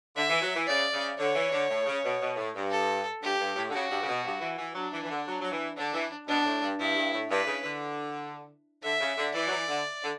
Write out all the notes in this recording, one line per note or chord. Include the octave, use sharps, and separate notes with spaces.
D3 E5
E3
F#3
E3
C#3 D5
C#3
D3 C#5
E3
D3
A2
C#3
B2
B2
A2
G2
A4
G2 G4
G2
A2
D3
C#3 F#4
G2
C#3
B2
G2
E3
E3
F#3 D4
E3
E3
D3
F#3
F#3
E3
D3 D4
E3
B2 D4
A2
G2
G2 E4
G2
A2
G2 B4
C#3
D3
D3 E5
C#3
D3
E3 D5
F#3
E3
D3
D3